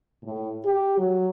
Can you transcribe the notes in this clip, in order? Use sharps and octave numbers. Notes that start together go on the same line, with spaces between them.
A2
G4
F#3